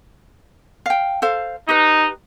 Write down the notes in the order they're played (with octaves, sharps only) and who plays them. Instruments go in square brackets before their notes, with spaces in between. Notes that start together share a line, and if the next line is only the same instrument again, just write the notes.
[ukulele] F5 G5
A4 C5 F5
[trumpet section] D#4 [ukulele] G4 B4